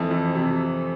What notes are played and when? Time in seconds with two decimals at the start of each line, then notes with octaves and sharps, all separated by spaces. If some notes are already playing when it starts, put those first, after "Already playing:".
Already playing: F2 E3 A3
0.11 F2
0.35 C3